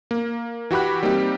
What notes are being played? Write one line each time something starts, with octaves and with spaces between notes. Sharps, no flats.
A#3
E3 F#4 G4 B5 F#6
G3 A#3 C4 D#4 G4